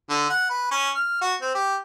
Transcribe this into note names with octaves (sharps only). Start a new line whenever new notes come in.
D3
F#5
B4
C#4
F6
F#4
C4
G4